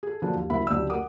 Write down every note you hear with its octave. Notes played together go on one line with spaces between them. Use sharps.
G#4 A4
D3 F3 F#3 A#3 D4
D#2
F#1 D2 A#3 E4 E5 B5
F#1 D2 D3 G4 D5 E6
A#4 F#5 D6 D#6